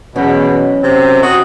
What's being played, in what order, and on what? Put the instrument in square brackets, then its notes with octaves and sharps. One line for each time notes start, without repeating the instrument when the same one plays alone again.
[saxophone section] E2 B2 [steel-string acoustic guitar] F#3 C#4
[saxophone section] F#2 C3 C4
F#4 D#5